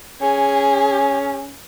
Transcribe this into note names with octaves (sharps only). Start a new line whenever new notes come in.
C#4 G#4